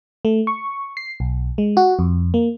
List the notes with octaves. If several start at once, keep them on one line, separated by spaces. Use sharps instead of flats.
A3
C#6
C7
B1
G#3
F#4
F2
A#3